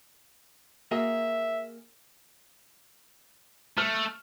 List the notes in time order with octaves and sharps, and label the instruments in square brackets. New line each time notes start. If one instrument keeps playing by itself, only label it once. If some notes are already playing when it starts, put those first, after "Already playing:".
[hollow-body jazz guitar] A#3 F#4 G#4 [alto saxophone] E5
[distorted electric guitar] A3 [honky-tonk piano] F6